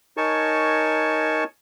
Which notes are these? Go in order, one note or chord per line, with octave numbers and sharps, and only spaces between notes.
D#4 A#4 C#5 G#5 A5 C#6